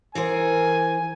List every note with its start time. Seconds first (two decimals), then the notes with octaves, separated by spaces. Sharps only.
0.15 E3 G#4 A#4 C5 G#5